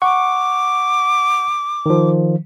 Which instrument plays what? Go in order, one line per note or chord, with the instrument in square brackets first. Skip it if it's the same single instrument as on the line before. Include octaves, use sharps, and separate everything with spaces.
[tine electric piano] F#5 C#6 [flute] D6
[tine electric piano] D#3 F3